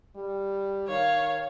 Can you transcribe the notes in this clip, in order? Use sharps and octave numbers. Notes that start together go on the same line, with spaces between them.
G3
D#3 C#5 F5